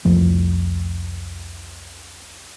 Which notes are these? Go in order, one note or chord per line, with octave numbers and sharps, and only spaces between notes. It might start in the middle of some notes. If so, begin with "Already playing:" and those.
C2 F2 F3 A3